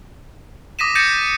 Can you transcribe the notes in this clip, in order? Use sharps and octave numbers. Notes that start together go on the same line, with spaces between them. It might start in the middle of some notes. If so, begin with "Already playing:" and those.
D6 D#6 A#6 B6 D#7 E7
G6 A6 A#6 C#7 D#7 E7